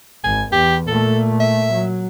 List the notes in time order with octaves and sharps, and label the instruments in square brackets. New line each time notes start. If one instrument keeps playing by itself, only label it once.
[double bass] G#1 [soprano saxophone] G#5
[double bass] E2 [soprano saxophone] G4
[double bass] A#2 A3 [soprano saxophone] A4
[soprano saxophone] E5
[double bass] F#3